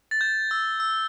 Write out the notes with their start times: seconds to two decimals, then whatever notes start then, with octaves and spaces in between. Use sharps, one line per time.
0.11 A6
0.21 G6
0.51 E6
0.80 E6